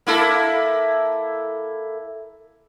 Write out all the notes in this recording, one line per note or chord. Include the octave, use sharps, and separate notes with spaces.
A#3 E4 A4